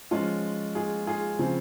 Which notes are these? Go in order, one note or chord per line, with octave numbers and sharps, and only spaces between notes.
F3 G#3 C#4 F4
F4 G#4
F4 G#4
C#3 F3 C4